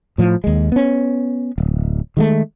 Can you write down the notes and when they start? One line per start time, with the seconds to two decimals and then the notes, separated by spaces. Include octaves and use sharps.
0.18 A2 F3
0.44 D#2 G#3
0.72 B3 C#4
1.58 D1
2.17 D#3 G#3 A3